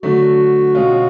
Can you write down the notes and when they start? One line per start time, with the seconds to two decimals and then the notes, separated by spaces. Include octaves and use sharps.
0.03 D3 F#3 A3 F#4
0.75 B2 G#3 C#4 F4